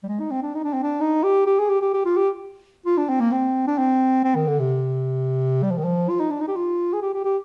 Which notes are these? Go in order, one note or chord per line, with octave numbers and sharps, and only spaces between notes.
G3
G#3
D#4
C4
D4
D#4
D4
C4
D4
D#4
G4
G4
G#4
G4
G4
G4
F4
G4
F4
D4
C4
A#3
C4
D4
C4
C4
D#3
D3
C3
G3
F3
D#3
F3
F4
D#4
D4
D#4
G4
F4
G#4
G4
G4
G4